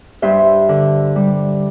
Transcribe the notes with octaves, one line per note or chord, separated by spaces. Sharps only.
G2 C5 E5
D3
G3